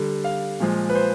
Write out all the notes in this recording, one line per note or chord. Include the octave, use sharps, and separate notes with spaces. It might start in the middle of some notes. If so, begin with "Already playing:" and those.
Already playing: D3 G3
F5
A#2 F3 G#3
B4
C5